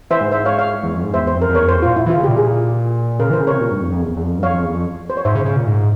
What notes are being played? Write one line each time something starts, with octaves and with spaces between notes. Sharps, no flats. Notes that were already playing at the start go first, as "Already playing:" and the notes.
E3 C5 E5
G#2
C5 E5
C#5 F5
C#5 F5
E2
F2
G#2
E2 C5 E5
C5
F2
A#4
F2
E2 A#4 C#5
F2 C5
E2
F4
A#2
E4
E3 F4
C#3
G4
A#2
G#4
C#3 A#4
E3 C5
C#3
C3 A#4 C#5
A#2
G2
F2
F2
E2
E2
F2
G2
F2 C#5 F5
F2
E2
F2
C5
C#5
G#2 C5 E5
C#3
C#3
A#2
G#2